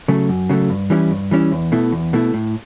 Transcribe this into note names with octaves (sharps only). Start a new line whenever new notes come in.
C#3 F#3 A3
F#2
C#3 F#3 A3
G2
E3 G3 C#4 E4
G2
E3 G3 C#4 E4
E2
B2 A3 E4
E2
B2 A3 E4
A2